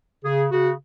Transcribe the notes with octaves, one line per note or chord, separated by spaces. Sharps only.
C#3 G#4
C#3 F#4